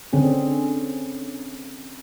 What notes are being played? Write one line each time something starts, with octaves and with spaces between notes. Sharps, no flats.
D3 C4 C#4 G#4